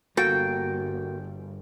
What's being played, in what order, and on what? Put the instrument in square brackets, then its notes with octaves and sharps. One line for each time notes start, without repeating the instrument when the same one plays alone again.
[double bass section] G1 [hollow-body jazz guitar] A#3 F#4 A4 [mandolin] G5